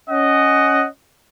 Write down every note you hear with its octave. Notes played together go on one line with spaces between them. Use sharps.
C#4 D#5 F#5